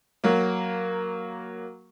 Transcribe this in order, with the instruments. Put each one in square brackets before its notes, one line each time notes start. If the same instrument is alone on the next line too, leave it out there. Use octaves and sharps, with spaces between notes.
[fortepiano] F#3 A#3